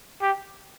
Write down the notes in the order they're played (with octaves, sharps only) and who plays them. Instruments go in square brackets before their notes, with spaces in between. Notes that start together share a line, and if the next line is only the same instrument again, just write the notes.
[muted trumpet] G4